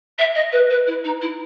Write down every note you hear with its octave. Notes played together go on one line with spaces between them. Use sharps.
E5
D#5
B4
B4
E4
D#4
E4